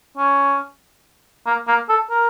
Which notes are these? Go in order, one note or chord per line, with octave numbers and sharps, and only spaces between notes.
C#4
A#3
A#3
A4
A#4